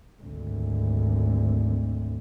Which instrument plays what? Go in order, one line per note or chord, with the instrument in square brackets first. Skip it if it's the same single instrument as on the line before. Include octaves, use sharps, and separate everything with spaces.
[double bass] G#1 D2